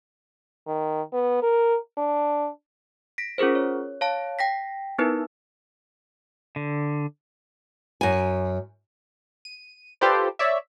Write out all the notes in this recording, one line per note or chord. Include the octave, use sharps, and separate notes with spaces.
D#3
B3
A#4
D4
A#6 B6 D7
C#4 F4 G#4 A#4 C5
C#5
C#5 F5 A5
G5 A#6 B6
B3 D#4 E4 A#4 B4
D3
F#2 G#5
D#7
F4 G4 A4 B4 C5 D5
C#5 D5 E5